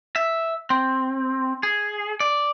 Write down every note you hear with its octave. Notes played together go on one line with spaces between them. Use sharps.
E5
C4
G#4
D5